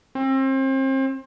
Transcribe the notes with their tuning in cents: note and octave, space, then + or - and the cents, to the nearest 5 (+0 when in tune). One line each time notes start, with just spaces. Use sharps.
C4 +35